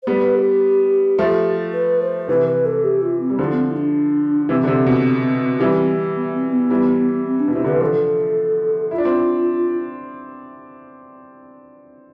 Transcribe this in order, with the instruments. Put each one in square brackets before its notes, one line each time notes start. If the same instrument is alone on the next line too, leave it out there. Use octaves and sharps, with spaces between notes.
[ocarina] C5
[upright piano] G3 B3 [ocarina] B4
[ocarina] G4
[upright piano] F3 A3
[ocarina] B4
C5
[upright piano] C3 E3 [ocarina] B4
[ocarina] B4
A4
G4
F4
C4
[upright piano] G3
[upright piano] D3 F3 [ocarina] E4
[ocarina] B3
C4
E4
D4
[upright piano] C3 E3 [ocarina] C4
[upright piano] D3
C3
B2
E3 G3
[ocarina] B3
C4
B3
[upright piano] E3 G3
[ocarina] C4
D4
[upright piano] B2
[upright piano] C3 [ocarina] E4
[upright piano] D3
[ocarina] B4
[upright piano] E3
[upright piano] D3 F3 [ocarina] A4
[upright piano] E4 [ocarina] F4
[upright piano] D4
C4